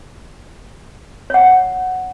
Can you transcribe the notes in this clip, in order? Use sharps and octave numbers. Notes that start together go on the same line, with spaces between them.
C#5 F#5